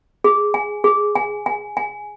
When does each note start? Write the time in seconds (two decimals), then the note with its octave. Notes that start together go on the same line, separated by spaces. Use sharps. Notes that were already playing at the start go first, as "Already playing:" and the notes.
0.24 G#4
0.54 G#5
0.84 G#4
1.15 G#5
1.46 G#5
1.77 G#5